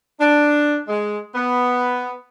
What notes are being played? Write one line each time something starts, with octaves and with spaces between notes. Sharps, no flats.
D4
G#3
B3